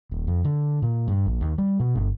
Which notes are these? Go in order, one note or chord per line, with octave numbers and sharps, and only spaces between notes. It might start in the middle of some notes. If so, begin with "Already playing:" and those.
D#1
F2
D3
A#2
G2
A#1
D#2
G3
B2
G1